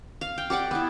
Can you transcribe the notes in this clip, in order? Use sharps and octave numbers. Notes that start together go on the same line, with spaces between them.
F5
G5
G4 D5 F#5 D6
B3 E4